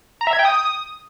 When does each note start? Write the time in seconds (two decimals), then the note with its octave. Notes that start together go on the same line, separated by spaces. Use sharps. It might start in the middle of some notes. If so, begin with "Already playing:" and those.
0.21 A#5
0.27 E5
0.33 G#6
0.39 G5
0.45 D#6